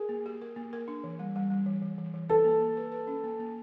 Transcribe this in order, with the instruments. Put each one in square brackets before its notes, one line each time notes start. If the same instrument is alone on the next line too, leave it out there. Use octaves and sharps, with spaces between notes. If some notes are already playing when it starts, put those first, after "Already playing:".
Already playing: [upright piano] G#4 [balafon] A#4
[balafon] A#3
G4
A#4
A#3
A#4
D4
E3
G3
G3
G3
E3
E3
E3
E3
[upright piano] A4 [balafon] B4
[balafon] A#3
A#3
B4
B4
C#4
A#3
A#3